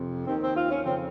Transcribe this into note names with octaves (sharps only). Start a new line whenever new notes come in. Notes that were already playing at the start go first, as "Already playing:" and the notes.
Already playing: F2 C3
D#2 D#3 C4
C4
F4
C#4
F2 C#3 C4